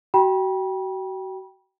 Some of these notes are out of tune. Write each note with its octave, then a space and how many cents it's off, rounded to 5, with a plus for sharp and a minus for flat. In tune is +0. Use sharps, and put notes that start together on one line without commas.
F#4 +30 G5 +0 B5 -35